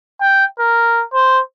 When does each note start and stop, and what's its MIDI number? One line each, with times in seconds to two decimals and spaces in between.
0.21 0.44 79
0.59 1.03 70
1.13 1.41 72